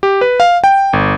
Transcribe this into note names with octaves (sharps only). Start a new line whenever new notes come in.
G4
B4
F5
G5
G1